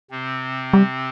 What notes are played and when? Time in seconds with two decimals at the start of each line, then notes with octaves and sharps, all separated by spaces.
0.11 C3 C4
0.74 G3